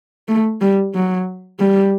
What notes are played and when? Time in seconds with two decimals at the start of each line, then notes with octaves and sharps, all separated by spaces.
0.28 A3
0.61 G3
0.95 F#3
1.60 G3